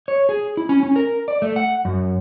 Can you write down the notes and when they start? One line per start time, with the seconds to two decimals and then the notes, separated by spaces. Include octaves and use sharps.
0.08 C#5
0.29 G#4
0.57 E4
0.69 C#4
0.83 C#4
0.96 A#4
1.28 D5
1.42 A3
1.56 F#5
1.85 F#2